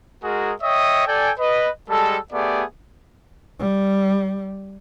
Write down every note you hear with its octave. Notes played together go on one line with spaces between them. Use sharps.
G#3 F#4 G#4 A#4
C#5 D#5 E5 G5 D#6
A4 D5 G5 G#5
B4 D#5
G3 G#3 A4
A3 B3 G4 G#4 D5
G3